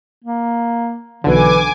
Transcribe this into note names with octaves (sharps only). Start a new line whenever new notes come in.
A#3
B1 D3 E3 G#5 D6